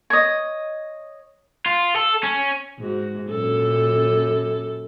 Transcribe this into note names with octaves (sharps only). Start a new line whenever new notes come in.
C#5 D#5
F4
A4
C#4
G#2 F#4
F#2 A#2 A4